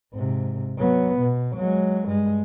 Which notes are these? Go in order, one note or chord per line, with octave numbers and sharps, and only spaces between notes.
G#2 C3
F#3 B3
B2
F#3 G#3
G2 G#3